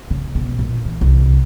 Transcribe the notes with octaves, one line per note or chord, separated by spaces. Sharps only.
C#3
B2
A#1
E3
C2